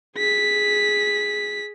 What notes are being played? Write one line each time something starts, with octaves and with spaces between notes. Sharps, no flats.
G#4 B6